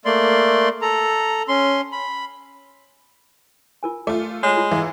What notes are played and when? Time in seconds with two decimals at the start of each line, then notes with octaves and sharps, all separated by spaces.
0.05 A3 A#3 D5 C6
0.82 A4 A#5
1.48 C#4 C6
1.92 B5
3.83 F4 A#4 G#5
4.07 A3 F4 D6
4.43 G#3 C#5
4.57 F4
4.71 E3 E5 F5 A#5